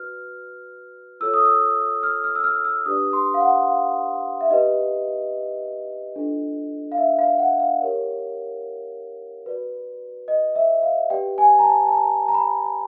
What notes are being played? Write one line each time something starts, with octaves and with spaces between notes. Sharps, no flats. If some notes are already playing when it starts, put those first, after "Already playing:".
Already playing: F#4 B4 D5 F6
F4 A4 C#5 E6
D#6
E6
F6
F6
E6
F6
F6
E6
D4 G4 B4 D5 D#6
C6
F5
F#5
F5
E5
D#4 G4 B4 D#5
D4 F4 A4
F5
E5
F5
F#5
F5
G4 A#4 C#5
F#4 B4 D5
D#5
E5
F5
G4 B4 D5 G5
G#5
A#5
A5
A5
A#5
A#5
B5